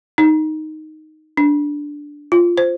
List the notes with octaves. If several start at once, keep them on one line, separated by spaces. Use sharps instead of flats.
D#4
D4
F4
C5